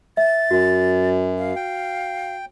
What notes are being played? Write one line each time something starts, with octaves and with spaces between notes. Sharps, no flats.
E5 A6
F#2 F#4
F5
G5